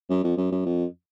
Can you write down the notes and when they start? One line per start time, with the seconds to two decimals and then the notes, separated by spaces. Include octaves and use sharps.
0.10 F#2
0.24 F2
0.38 F#2
0.52 F#2
0.66 F2